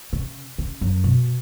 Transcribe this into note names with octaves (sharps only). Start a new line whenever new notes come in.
C#3
C#3
F#2
B2